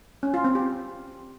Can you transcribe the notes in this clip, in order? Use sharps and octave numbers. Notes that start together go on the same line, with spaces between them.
C#4
F4
C4
G4